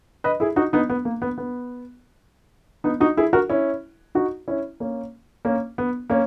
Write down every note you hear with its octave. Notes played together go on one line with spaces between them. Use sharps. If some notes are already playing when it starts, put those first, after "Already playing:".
B4 D#5
E4 G#4
D#4 F#4
B3 D#4
B3
A#3
B3
B3
B3 D#4
D#4 F#4
E4 G#4
F#4 A#4
C#4 E4
D#4 F#4
C#4 E4
A#3 C#4
A#3 C#4
B3
A#3 C#4